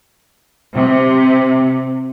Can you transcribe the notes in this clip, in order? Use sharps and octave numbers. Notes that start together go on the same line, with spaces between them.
C3